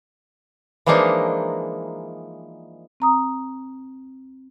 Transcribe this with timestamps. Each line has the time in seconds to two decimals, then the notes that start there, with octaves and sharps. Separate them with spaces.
0.86 E3 F3 G#3 A#3 D4 D#4
3.00 C4 A#5 D#6